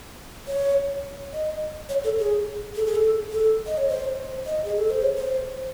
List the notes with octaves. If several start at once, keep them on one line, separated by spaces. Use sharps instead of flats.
C#5
D#5
C#5
A4
G#4
A4
G#4
A4
A4
D#5
C#5
C5
D#5
G#4
A4
C5
C#5
C5